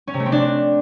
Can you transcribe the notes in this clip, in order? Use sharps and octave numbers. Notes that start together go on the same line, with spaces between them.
C#4
C3
A3
C4
D4